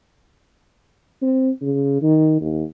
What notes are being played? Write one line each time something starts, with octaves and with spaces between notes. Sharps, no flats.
C4
C#3
D#3
D#2